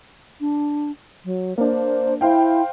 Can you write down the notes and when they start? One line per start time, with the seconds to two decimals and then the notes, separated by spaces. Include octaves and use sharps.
0.41 D4
1.25 F#3
1.58 A#3 D4 C5
2.21 E4 C5 F5 G5